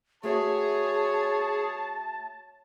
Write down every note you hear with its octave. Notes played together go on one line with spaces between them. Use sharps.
A3 F#4 G#4 C#5 E5 A5